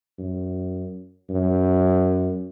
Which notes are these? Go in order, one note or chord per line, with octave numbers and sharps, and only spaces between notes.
F#2
F#2